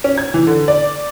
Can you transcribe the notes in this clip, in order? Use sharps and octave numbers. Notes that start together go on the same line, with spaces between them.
C#4
G#6
E3
D3
D5